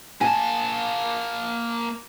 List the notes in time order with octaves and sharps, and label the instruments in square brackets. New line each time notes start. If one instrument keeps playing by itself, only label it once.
[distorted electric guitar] A#3 A5 [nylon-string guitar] G#5